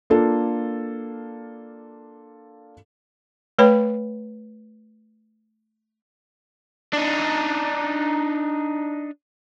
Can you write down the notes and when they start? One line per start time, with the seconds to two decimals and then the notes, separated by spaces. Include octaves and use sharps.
0.10 A#3 D4 F4 A4
3.59 A3 B4 C#5 G5 B5
6.93 D4 D#4